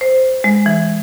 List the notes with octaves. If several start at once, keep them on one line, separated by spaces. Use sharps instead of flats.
C5
G#3
E3